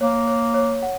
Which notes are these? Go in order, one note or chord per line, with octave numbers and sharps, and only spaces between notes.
A#3 C#5
C#5
C#5
F#5